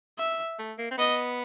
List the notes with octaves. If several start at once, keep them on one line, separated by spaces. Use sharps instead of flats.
E5
A3
A#3
C4
B3 D#5